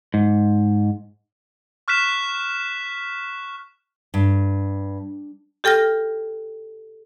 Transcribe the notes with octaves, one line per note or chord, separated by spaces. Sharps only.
G#2
C#6 F6 F#6 B6 E7
G2
G4 A4 G5 F6 A#6